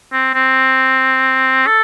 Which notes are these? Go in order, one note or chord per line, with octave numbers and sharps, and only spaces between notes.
C4
C4
A4